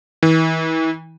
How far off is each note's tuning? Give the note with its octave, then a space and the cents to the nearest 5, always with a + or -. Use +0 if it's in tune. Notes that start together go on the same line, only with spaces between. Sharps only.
E3 -35